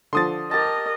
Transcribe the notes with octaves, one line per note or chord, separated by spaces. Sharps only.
D3 F3 C6 D#6 A6
G4 A#4 D#5 A5